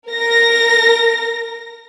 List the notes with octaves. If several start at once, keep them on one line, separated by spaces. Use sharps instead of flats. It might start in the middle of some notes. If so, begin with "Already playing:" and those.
A#4 A#6